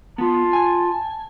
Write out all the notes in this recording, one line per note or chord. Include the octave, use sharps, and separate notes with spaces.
B3 F4 A5
G#5